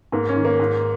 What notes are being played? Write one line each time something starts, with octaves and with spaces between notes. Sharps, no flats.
G#2 A#3
C#4
D#3
A#3
G#2